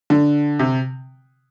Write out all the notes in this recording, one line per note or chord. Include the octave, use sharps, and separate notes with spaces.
D3
C3